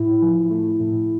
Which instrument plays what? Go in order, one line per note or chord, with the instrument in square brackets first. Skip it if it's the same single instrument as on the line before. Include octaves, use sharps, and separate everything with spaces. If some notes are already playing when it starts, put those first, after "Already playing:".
Already playing: [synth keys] A2 E4
F3
A3
A2